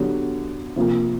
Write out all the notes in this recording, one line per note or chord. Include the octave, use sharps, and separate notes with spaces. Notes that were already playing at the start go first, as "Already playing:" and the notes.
Already playing: D3 F#3 B3 D4 G4
C3 F3 A#3